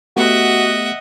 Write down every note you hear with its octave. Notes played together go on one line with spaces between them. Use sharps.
A3 B3 F#4 G4 D#5 E5 F#5